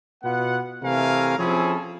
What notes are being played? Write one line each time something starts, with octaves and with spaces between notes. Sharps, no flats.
B2 B3 F4 F#5
C3 E3 A3 A#4 F5 G#5
F3 C4 C#4 E4 G#4 A4